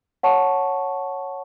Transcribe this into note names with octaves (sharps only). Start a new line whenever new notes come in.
C#5 F#5 A5 C#6